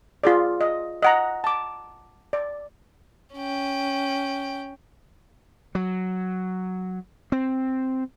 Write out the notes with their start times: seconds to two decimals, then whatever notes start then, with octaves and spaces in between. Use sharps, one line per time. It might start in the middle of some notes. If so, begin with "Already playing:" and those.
0.24 F4 G#4 D5
0.61 D#5
1.02 D#5 F#5 A#5
1.44 A5 D6
2.33 D5
3.34 C#4 G5
5.75 F#3
7.32 C4